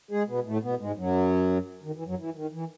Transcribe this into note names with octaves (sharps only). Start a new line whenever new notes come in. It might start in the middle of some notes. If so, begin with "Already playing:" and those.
G#3 G#4
B2 B3
A2 A3
B2 B3
G#2 G#3
F#2 F#3
D#3
E3
F#2 F#3
E3
D#3
E3